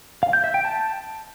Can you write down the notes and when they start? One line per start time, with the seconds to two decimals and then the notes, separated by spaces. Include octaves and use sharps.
0.23 F5
0.33 G6
0.44 E5
0.54 G5
0.65 A5